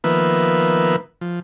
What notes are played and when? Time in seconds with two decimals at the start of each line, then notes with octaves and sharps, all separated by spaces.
0.04 D#3 F3 A#3 B3 B4 E5
1.21 F3